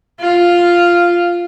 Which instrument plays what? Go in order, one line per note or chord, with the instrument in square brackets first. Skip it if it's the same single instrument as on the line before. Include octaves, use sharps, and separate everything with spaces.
[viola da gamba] F4